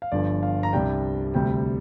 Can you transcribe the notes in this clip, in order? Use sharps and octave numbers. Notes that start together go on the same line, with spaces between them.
F5
G1 G2 F3 D5
F5
A#5
C2 C3 G3 D4 G5
D2 C3 G3 G5